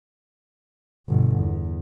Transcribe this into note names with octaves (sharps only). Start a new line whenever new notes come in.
G1 B2
E2